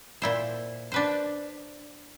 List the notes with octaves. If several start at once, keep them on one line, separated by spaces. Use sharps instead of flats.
A#2 E4 C5
D4 B4 C5